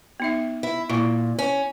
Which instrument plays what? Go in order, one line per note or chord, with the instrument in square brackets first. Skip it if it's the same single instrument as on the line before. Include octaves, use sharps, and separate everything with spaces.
[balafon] B3 D#4 E5
[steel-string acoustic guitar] E4
[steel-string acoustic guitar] A#2 [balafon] E4
[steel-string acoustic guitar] C#4